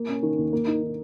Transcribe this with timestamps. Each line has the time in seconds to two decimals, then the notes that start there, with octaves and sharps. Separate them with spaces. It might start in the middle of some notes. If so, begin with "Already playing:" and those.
Already playing: A#3
0.09 C#4
0.23 D#3
0.38 D#2
0.53 A#3
0.67 D#4
0.83 D#3